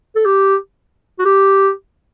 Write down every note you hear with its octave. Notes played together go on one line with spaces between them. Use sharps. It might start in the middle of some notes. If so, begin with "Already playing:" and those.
A4
G4
F#4
G4